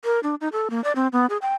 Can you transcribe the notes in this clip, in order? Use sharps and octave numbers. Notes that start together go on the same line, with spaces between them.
A#4
D4
D#4
A4
A#3
D5
C4
B3
G#4
G5